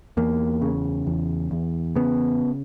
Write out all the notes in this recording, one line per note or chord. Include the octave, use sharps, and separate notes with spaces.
E2 A#3
C#3
E2
E2
C#3 B3